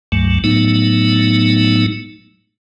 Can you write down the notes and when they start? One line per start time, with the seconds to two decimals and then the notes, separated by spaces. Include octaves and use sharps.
0.12 C#2 G2 F#3 A3
0.44 A2 F#3 A3 B3 D#4